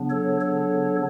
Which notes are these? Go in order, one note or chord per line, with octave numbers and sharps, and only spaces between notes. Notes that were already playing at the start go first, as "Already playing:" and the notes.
Already playing: C#3 F#3 B3 D4
A4 C#5
A4 C#5